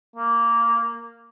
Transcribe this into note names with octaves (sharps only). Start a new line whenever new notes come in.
A#3